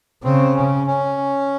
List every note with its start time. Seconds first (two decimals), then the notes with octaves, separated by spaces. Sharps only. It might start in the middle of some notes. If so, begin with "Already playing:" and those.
0.24 C#3 C4
0.55 C#4
0.87 C#4